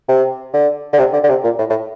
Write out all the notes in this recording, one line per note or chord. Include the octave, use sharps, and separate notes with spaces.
C3
D3
D3
C3
D3
D3
C3
A#2
A2
A2